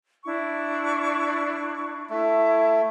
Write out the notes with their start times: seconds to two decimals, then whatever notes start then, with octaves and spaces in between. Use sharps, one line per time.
0.24 D4 E4 C#6
2.10 A3 E4 E5